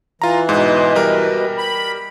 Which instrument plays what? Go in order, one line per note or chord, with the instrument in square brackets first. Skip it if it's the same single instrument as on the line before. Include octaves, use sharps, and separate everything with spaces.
[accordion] E3 [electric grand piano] F4 A#5
[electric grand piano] G#2 [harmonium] B2 B4 D#5
[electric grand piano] G3 A#4
[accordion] B5